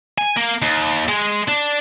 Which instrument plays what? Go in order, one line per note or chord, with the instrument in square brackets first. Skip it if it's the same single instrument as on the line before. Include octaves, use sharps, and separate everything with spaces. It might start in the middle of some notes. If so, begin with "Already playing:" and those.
[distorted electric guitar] G#5
A#3
D#2
G#3
D4